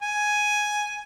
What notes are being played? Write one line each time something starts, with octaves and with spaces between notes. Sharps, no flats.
G#5